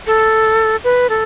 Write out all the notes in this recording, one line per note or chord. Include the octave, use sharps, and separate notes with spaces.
A4
B4
A4